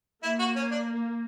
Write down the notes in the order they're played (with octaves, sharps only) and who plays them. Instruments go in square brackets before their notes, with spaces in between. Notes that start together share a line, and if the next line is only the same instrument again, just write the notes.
[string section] A#3 [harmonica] E4
[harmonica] F#4
C#4
D4